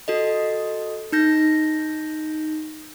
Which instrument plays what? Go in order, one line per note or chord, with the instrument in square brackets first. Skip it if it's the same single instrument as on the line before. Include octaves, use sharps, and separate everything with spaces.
[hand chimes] F#4 A4 D#5
D#4 G6 A#6